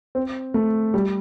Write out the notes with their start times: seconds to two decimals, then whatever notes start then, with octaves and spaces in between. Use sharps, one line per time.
0.15 C4
0.54 A3
0.94 G3